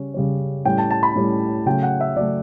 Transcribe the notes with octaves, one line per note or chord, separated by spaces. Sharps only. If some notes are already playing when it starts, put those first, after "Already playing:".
Already playing: C#3 G3 C#4
C#3 G3 C#4
A2 G3 C#4 G5
A5
A5
B5
A2 G3 C#4
C#3 F#3 A3 G5
F#5
E5
C#3 F#3 A3 D5